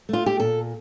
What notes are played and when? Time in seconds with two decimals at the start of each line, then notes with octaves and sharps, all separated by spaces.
0.09 A3 F4
0.26 G4
0.40 A#2 A4